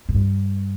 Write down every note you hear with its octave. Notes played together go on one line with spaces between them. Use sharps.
A2
G2